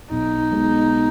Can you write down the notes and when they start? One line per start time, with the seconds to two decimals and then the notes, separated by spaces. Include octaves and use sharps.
0.10 B1 D#4
0.52 B2 G#3